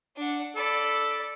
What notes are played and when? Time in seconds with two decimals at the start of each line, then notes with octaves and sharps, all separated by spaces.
0.16 D4 F#5
0.56 A4 D5 B5